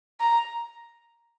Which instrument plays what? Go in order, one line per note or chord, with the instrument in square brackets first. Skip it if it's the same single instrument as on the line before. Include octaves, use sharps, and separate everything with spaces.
[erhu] A#5